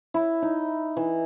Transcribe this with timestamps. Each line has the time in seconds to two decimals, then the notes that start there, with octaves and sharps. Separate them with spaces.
0.14 E4
0.42 D#4
0.97 E3